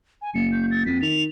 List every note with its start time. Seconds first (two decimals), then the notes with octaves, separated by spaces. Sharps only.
0.22 G#5
0.34 F#1 C#7
0.52 G6
0.71 A6
0.86 F2 B6
1.02 D#3 F7